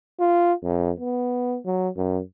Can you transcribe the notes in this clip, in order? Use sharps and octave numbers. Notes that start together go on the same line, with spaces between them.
F4
F2
B3
F#3
F#2